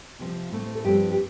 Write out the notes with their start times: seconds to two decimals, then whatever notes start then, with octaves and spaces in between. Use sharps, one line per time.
0.19 C3 F3 C4
0.52 A2 A3 C4
0.66 C5
0.75 A4
0.84 G2 F3 C4 D4 G4
1.11 G4